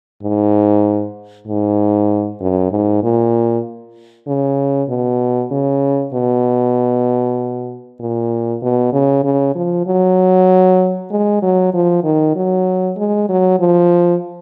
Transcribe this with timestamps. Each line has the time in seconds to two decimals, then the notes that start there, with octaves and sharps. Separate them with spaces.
0.23 G#2
1.47 G#2
2.40 F#2
2.71 G#2
3.03 A#2
4.27 C#3
4.89 B2
5.51 C#3
6.14 B2
8.00 A#2
8.62 B2
8.93 C#3
9.24 C#3
9.55 F3
9.87 F#3
11.11 G#3
11.43 F#3
11.73 F3
12.04 D#3
12.35 F#3
12.97 G#3
13.29 F#3
13.60 F3